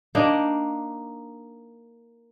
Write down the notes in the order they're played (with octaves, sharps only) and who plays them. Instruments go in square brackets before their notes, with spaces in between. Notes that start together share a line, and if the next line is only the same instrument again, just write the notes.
[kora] A#3 D4 D#4